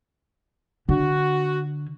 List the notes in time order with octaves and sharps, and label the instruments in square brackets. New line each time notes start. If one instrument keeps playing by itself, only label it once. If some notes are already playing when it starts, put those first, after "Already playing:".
[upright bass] D3 [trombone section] F#4